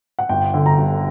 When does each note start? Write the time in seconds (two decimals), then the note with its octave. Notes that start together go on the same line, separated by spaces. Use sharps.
0.19 F#5
0.29 G1 G5
0.54 D3
0.66 A#5
0.78 G1